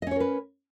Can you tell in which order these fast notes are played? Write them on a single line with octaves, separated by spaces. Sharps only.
D#5 C#4 C#5 A#4 B4